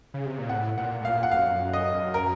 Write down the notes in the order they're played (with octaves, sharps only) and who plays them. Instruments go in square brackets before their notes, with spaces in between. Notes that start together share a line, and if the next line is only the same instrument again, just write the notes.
[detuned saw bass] C#3
C3
A#2
[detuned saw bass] A2 [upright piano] F#5
[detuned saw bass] A#2 [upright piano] F#5
[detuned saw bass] A2
[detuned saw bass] A#2 [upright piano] F5
[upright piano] F#5
[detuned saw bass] F#2 [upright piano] F5
[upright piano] D#5
A#4